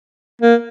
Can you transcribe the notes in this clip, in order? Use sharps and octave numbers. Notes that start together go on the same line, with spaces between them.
A#3